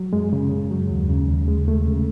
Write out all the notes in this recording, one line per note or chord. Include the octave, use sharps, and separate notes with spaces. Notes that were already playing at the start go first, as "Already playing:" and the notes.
Already playing: F#3
F#2 G#3
C#3
F#2
F#3
D#2
C#3
D#2
G#3
D#2 A3
C#3